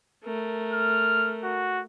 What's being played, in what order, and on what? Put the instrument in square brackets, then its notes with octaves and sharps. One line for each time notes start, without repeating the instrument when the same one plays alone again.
[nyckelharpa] A3 A#4
[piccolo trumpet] F6
F#4